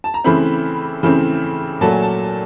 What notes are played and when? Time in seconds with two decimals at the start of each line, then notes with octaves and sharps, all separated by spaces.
0.04 A5
0.14 A#5
0.24 C#3 E3 A3 C4 B5
1.03 C#3 E3 A3 C4
1.81 A#2 F#3 A3 A5
1.92 G#5
2.02 A5